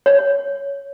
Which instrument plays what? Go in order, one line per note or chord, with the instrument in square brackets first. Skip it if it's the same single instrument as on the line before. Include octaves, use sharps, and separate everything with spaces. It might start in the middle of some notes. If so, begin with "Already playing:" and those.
[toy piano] C#5